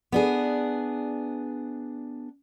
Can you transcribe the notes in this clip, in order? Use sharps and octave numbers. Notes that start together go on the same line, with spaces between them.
B3 D4 G#4